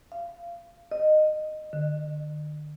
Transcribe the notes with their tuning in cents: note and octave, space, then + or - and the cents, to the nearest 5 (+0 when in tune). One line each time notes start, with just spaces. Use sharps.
F5 -25
D#5 -15
D3 +40